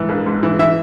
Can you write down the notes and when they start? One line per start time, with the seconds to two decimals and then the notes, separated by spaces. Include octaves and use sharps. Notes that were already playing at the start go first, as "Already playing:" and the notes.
Already playing: G#2 E3
0.09 A#1
0.26 G#2
0.43 E3
0.59 E3 E5